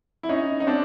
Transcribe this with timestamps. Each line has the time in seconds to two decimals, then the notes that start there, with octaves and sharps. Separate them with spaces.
0.23 E4
0.29 C#4 D#4
0.60 D#4
0.67 C4 D4